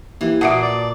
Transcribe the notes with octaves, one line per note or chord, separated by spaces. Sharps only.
E3 A#3 E4 G4
A#2 F#4 E5 F#5 A5 D#6 C7
D5